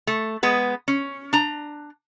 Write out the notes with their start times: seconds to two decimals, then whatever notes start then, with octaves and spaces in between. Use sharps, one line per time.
0.07 A3
0.43 G#3 B3 B4
0.88 C#4
1.33 D4 A#5